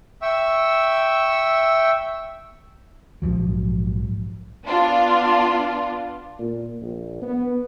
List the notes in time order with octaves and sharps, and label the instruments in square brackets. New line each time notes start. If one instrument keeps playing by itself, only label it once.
[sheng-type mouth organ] E5 G5 C#6 E6
[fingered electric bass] A#1 G#2 F3 F#3
[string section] B3 D4 F4
[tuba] A#2
A#1
B3